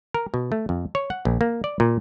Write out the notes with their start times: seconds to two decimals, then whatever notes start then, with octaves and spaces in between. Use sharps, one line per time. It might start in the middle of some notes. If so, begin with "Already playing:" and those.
0.14 A#4
0.34 B2
0.52 A3
0.69 F2
0.95 C#5
1.10 F#5
1.25 A#1
1.41 A#3
1.64 D5
1.80 A#2